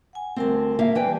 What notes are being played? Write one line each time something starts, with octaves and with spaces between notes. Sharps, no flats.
F#5 G#5
D2 G3 C4 A#4 A5
A#3 E5 F5
E3 G4 B4 D5 G5 A5